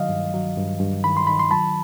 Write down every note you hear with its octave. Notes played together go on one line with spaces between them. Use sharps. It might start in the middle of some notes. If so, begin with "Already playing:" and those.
Already playing: D#3 F#3 D#5 F5
G2
F#3
G2
G2
D#3 B5
C6
D#3 B5
C6
F#3 A5 B5